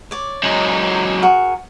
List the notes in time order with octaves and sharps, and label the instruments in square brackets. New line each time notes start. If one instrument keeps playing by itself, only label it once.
[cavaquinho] C#5 D5
[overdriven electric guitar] F#2 G#3
[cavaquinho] F#4 G#4 A#4